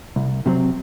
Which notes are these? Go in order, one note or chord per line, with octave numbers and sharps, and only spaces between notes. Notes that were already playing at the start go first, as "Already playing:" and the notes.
C2
C3 F#3 C4